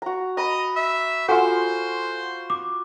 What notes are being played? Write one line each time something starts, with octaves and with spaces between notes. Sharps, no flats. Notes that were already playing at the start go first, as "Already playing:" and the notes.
F#4 A#5
D#5 A#5 B5
E5
F4 F#4 A4 C5 F#5 G#5
D6